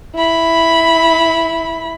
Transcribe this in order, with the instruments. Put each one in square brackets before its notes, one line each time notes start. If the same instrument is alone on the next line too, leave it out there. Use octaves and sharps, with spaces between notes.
[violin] E4 B5